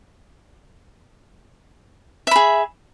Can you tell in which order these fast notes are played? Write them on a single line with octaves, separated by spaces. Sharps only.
E5 B5 G#4